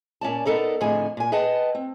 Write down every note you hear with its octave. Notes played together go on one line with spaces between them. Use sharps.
A#2 C#4 D5 A5
B3 D#4 A4 A#4 D5
F2 A2 D3 G#4 G#5
A#2 G#5
G#4 B4 D#5 F#5 G5 A5
C4